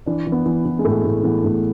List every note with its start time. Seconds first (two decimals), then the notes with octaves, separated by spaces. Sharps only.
0.06 E3 D4
0.27 E3
0.32 B3
0.46 E3
0.65 E3
0.79 G#3
0.85 A2 A3
1.04 A2
1.23 E3 B3
1.44 A2